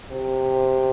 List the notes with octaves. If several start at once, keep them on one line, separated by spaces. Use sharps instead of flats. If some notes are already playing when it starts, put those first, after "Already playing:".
C3